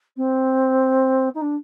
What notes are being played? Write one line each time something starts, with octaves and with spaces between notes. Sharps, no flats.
C4
D#4
D4